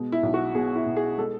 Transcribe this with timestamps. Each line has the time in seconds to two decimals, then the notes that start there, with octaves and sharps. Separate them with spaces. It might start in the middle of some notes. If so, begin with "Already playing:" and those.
Already playing: B2 G#3
0.12 E4
0.23 B1
0.34 F#4
0.54 B2 G#4
0.76 E4
0.86 B2
0.96 G#4
1.18 G#3 A4